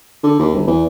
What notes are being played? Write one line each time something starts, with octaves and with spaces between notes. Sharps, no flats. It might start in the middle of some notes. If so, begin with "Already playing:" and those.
D3
D#2
G1
E2